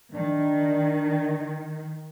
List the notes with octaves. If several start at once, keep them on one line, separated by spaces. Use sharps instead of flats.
D#3 D4